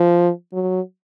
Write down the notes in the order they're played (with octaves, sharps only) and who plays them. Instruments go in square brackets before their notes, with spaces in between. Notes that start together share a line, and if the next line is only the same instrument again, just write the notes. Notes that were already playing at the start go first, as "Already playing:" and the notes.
Already playing: [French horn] F3
F#3